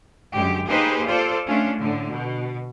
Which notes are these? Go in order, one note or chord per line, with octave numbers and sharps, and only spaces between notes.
F#2 D3 G#3 G4
A#3 D#4 G4 G#4 B4 C5
F4 A4 C5 D5
A3 C#4 D4 F4
A2 D3
B2